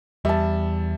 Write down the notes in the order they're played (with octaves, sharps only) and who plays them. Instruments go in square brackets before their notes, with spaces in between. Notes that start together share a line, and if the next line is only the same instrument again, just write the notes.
[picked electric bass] E2 [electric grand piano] G3 [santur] E5 A5